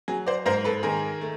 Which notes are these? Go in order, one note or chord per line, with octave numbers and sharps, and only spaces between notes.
F#3 G#4
C5 D5
G#2 A#4 C5
A4 B4
D#3 G#4 A#4
A3